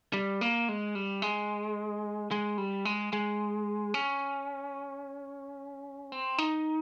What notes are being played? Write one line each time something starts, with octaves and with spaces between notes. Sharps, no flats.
G3
A#3
G#3
G3
G#3
G#3
G3
G#3
G#3
C#4
C4
D#4